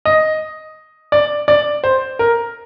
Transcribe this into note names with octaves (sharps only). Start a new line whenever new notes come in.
D#5
D5
D5
C5
A#4